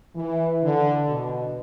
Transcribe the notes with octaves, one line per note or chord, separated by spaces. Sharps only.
E3
D3
B2